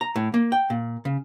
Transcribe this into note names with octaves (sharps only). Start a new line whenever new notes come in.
A#5
A2
A#3
G5
A#2
C#3